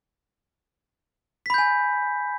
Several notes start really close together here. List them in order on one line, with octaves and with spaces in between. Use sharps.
B6 B5 G6 G#5